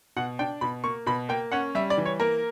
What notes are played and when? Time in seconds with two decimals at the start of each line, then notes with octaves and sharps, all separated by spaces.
0.17 B2 F#5
0.39 D4 G5
0.61 B2 B5
0.84 A#3 C#6
1.07 B2 B5
1.29 A#3 G5
1.52 C#4 F#5
1.75 G3 E5
1.90 D5
1.98 E3
2.06 C#5
2.20 A#3 A#4